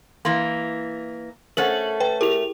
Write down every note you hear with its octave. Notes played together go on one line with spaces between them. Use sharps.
E3 A#3 C6
A3 C#4 A4 A#4 C5 F#5 F#7
B4 G5 A#5
E4 G4 G#4 A#4 F7